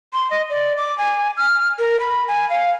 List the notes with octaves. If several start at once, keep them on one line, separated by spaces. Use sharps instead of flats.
C6
D#5
D5
D6
G#5
F6
A#4
B5
G#5
F5